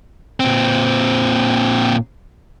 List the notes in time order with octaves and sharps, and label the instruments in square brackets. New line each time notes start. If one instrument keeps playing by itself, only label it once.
[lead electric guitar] A#2 C4